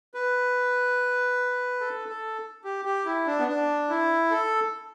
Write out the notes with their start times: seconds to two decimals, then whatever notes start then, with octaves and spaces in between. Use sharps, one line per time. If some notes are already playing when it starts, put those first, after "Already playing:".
0.14 B4
1.81 A4
2.08 A4
2.64 G4
2.85 G4
3.05 E4
3.27 D4
3.39 B3
3.48 D4
3.90 E4
4.31 A4